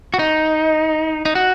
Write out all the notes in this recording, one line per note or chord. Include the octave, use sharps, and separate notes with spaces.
F#4
D#4
D#4
F#4